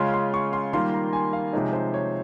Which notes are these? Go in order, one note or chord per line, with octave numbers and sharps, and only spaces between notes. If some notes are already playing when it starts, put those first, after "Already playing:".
Already playing: C#3 G#3 C#4 F4 C6
C6
C#6
C6
D#3 G3 A#3 F4 C6
A#5
G#5
F5
C3 F3 G#3 D#4 C#5
C5
C#5